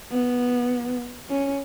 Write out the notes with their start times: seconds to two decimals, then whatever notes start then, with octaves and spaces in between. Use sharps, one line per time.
0.11 B3
1.30 C#4